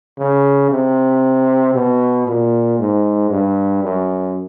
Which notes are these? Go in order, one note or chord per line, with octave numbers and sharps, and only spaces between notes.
C#3
C3
B2
A#2
G#2
G2
F#2